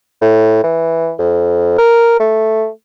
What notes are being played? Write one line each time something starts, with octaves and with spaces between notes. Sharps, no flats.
A2
E3
F2
A#4
A3